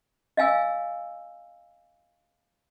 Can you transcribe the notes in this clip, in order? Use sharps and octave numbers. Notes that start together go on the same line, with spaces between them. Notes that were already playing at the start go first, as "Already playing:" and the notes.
D#5 F5 G#5 E6